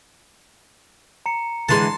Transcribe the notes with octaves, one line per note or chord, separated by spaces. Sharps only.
A#5 C#7
D3 E3 G#3 A5 C6